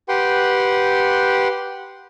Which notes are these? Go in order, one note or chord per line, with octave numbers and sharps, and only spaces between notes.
G4 B4 F#5 G5 C6